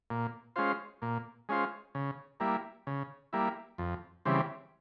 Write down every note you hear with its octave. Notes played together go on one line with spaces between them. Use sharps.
A#2
G#3 C#4 F4 C5
A#2
G#3 C#4 F4 C5
C#3
G3 A#3 E4
C#3
G3 A#3 E4
F2
C#3 E3 G3 C4